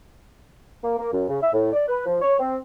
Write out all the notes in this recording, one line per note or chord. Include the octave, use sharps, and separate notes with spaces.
A#3
A#3
F#2
C#3
E5
A2
D5
B4
F3
C#5
C4